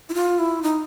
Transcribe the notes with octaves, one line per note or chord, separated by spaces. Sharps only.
E4
F4
E4
D#4